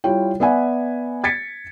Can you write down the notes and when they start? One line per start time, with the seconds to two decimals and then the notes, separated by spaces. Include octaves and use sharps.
0.04 G3 E4 F4 C#5 G5
0.40 B3 D5 E5 F#5 G#5 B5
1.24 G#6 A6 B6 C#7